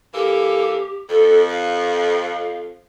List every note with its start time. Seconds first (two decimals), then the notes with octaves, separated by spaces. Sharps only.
0.14 E3 A#3 G4 A4
1.09 F2 A4
1.49 F5